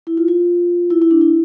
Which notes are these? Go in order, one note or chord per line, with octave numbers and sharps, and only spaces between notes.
E4
F4
F4
E4
E4
D4
E4